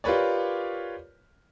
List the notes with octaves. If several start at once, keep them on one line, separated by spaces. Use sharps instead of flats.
F4 G4 A#4 B4 C#5 D5